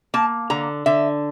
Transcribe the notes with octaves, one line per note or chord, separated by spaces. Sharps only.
A#3 A5
D3 A#5
D3 E5